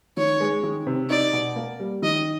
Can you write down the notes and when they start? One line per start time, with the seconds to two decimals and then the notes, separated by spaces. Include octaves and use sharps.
0.17 D#3 C#5
0.40 G#3
0.63 D#3
0.87 C3
1.09 D#4 D5
1.33 B2
1.56 A#3
1.80 G3
2.02 D#3 D#5